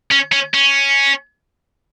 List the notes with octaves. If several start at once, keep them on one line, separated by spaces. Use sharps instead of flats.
C#4
C#4
C#4